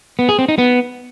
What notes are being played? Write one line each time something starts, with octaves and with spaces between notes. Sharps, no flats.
B3
G#4
C4
D#4
B3